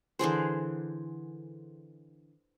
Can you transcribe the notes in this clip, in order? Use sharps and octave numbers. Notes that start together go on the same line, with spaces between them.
D3 E3 G#4 C5